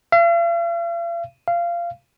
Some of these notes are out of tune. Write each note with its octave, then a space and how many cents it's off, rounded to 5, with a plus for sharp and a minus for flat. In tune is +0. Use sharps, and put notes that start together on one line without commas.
F5 -45
F5 -20